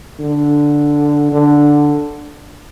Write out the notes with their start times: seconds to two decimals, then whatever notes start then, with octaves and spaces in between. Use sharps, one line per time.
0.20 D3
1.32 D3